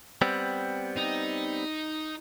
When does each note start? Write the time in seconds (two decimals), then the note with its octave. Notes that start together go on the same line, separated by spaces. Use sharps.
0.22 G3 B3 C4
0.97 D#4